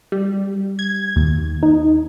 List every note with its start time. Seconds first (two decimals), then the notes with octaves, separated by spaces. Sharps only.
0.12 G3
0.79 G#6
1.16 D#2
1.63 D#4